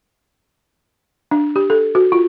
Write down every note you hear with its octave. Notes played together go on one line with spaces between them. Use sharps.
D4
G4
A4
F#4
F4